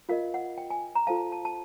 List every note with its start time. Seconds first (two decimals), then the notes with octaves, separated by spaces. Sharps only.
0.09 F4 A#4 D#5 F5
0.34 F#5
0.58 G5
0.70 G#5
0.95 A#5
1.07 F4 A4 C5 F5 A5
1.32 A5
1.45 A5